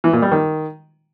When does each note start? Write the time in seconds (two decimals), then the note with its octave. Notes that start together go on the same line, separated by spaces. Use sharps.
0.04 E3
0.13 A#2
0.22 G3
0.32 D#3